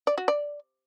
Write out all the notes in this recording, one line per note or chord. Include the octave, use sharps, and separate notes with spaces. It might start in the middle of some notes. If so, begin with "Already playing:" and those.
D5
F#4
D5